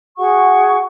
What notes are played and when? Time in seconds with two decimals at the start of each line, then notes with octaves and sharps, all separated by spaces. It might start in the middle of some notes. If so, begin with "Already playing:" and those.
0.18 F#4 G#4 F#5 C#6